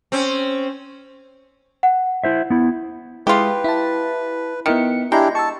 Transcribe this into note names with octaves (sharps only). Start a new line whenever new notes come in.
C4 C#4
F#5
E4 C5 E5
B3 E4
G#3 E4 F4 G4 B4
E4 A5
D#3 B3 E4 C#7
G#3 D4 E4 G4 G5 A#5
A5 C#6 E6